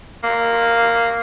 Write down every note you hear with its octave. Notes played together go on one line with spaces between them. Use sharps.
A#3